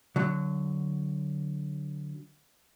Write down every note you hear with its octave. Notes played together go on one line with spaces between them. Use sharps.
D3 F#3